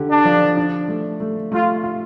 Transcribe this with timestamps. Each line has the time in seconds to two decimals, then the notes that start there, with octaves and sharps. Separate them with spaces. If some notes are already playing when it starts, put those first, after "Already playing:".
Already playing: D3 G4
0.09 D4
0.25 F3
0.57 D4
0.88 A3
1.20 A3
1.52 A3 F4
1.84 F4